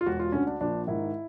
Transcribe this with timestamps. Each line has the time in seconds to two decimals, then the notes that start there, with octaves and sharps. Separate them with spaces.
0.01 F4
0.06 E1 F#4
0.19 F4
0.32 D2 D3 C#4
0.47 D4
0.60 A#1 D4
0.87 G#2 D#3 E4